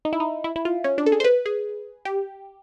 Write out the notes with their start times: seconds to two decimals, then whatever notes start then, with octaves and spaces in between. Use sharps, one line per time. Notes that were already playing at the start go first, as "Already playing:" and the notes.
0.05 D#4
0.13 E4
0.20 D#4
0.44 E4
0.56 E4
0.65 F4
0.84 C#4
0.98 D4
1.06 A4
1.12 G#4
1.20 C5
1.24 B4
1.46 G#4
2.05 G4